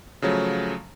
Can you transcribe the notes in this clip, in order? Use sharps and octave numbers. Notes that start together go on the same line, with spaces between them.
C#3 F3 F#3 A3